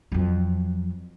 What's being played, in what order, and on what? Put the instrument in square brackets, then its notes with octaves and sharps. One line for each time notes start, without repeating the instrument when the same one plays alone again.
[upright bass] F2 F#3